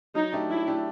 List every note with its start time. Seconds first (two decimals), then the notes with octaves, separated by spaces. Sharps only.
0.15 F#3 D#4
0.32 A3 D4 G4
0.50 F#3 E4
0.67 A3 D4 G4